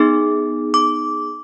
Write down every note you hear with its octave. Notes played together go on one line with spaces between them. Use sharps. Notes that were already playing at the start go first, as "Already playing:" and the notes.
Already playing: B3 D#4 G#4 D6
D6